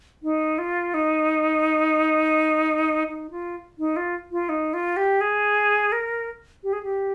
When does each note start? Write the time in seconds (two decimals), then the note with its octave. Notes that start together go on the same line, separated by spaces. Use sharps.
0.23 D#4
0.58 F4
0.94 D#4
3.08 D#4
3.31 F4
3.79 D#4
3.96 F4
4.32 F4
4.49 D#4
4.74 F4
4.97 G4
5.21 G#4
5.92 A#4
6.63 G4
6.73 G#4
6.83 G4